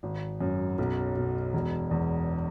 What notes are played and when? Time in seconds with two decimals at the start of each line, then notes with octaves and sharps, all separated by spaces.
0.03 G#1
0.41 F#2
0.78 B1
1.16 B2
1.54 E1
1.91 E2